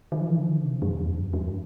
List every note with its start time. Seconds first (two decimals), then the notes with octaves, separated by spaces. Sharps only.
0.12 D#3
0.21 F3
0.30 E3
0.38 D3
0.48 D#3
0.56 D3
0.64 C3
0.74 B2
0.82 F#2
0.90 F2
0.99 E2
1.08 F2
1.16 G2
1.25 F#2
1.33 F2